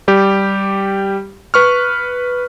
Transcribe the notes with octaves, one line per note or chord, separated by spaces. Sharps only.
G3 G4
B4 C#6 F6